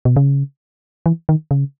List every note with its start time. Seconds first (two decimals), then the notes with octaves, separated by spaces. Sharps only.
0.05 B2
0.16 C#3
1.06 E3
1.29 D#3
1.51 C#3